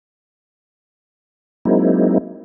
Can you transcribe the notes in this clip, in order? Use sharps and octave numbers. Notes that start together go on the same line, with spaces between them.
F#3 G#3 A#3 C4 D#4 E4